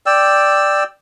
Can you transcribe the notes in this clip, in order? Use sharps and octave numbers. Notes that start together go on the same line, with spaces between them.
D5 G5 E6